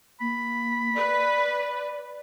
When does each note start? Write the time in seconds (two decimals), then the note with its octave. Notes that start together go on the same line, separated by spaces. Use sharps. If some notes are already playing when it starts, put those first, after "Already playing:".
0.21 A#3 B5
0.95 B4 D5